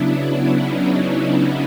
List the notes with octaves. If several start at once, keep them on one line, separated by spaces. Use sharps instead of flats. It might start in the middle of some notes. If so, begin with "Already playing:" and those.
Already playing: C#3 F#3 B3 D4 E4
C#4 D#4